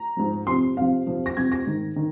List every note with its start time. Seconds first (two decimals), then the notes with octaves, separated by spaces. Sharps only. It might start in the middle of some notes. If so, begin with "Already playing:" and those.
Already playing: A#5
0.17 G#2 F3
0.47 F2 C3 F3 C6
0.77 F2 C3 F3 F5
1.07 F2 C3 F3
1.26 A#6
1.37 F2 C3 F3 G#6
1.52 A#6
1.66 G#2 D#3
1.96 D#3